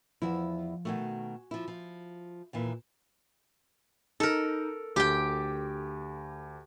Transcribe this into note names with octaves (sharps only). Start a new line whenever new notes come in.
E2 F3 E4
B2 D#3 A3 F#4 G#5
F3 E4
F3
D#2 A#2 E3
D#4 A4 A#4
D2 G4 G5